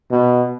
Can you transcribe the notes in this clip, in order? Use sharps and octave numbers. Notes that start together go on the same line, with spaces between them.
B2